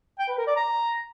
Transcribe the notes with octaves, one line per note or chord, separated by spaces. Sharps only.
G5
B4
A#4
D5
A#5